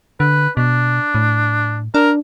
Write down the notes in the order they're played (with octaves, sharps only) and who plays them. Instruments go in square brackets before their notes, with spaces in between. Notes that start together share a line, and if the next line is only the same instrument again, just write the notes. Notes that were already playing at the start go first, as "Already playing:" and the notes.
[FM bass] D3 [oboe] B4
[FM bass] B2 [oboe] D4
[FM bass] A2
[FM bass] D4 [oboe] A#4